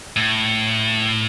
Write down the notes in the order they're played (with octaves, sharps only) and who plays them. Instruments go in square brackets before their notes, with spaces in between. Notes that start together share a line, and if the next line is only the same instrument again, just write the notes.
[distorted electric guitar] A2